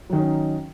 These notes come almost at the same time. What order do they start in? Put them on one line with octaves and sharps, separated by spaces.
F#3 D#3 D#4 C#4